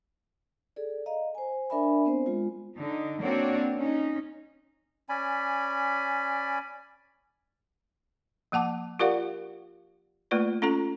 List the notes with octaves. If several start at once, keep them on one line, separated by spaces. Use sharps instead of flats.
G#4 A4 D5
D#5 F5 A#5
C5 G#5
D4 A#4 D5 E5 G#5 B5
B3 C4 C5
G#3 F4
D3 D#4
A#3 C4 D4 F#4 C#5 D5
C#4 D#4
C#4 D5 G#5 B5
F3 A#3 F#5 A5 D6
F4 G4 A#4 D5 F5 F#5
A3 A#3 F4 B4 D5
C#4 F4 A4 A#5